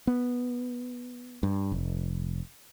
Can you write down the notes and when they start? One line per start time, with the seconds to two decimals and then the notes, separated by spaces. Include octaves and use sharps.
0.07 B3
1.43 G2
1.72 F1